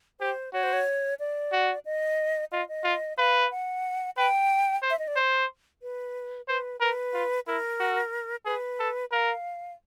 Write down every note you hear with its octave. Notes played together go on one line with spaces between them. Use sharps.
G4 C5
F#4 C#5
C5
C#5
D5
F#4
D#5
F4 D#5
D#5
F4
B4 F5
F#5
B4 G5
C5
E5
D#5
D5
C5
B4
B4 C5
A#4 B4
F4
E4 A#4
F#4
G#4 B4
A4
A#4 F5